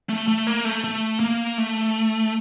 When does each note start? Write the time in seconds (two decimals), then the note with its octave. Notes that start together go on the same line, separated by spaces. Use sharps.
0.09 A3
0.28 A3
0.47 A#3
0.65 A3
0.84 A3
1.20 A#3
1.58 A3